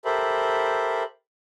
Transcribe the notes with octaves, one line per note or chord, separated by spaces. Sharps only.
G4 A4 A#4 C5 E5 B5